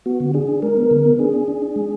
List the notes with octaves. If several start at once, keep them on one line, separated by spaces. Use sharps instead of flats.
B3 F#4
D3
D4 G#4
D4
G#3 A#4
B3
D3
B3
D4 G#4
D4
D4
D4
G#3